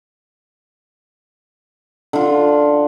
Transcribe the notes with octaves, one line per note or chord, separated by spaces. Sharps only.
D3 F4